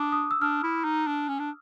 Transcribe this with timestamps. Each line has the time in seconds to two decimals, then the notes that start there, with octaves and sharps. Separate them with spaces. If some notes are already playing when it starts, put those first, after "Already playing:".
Already playing: D4 D6 D#6
0.12 D#6
0.31 E6
0.42 D4 F6
0.63 E4
0.84 D#4
1.07 D4
1.29 C#4
1.39 D4